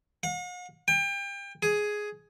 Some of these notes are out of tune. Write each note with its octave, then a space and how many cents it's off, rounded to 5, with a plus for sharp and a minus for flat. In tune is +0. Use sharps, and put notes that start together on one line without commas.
F#5 -45
G5 +30
G#4 +5